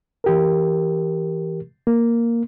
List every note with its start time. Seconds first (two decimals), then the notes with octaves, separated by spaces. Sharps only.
0.24 E3 G4 A#4
1.87 A#3